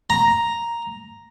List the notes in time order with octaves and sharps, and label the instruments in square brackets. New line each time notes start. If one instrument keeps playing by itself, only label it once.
[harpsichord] A#5